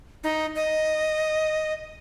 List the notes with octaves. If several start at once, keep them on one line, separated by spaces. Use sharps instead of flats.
D#4
D#5